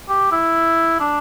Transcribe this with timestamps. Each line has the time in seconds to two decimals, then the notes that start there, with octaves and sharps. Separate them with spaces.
0.09 G4
0.32 E4
1.00 D4